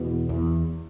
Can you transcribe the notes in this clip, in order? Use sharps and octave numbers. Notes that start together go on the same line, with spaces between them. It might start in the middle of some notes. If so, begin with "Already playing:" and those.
Already playing: E2 B2
E2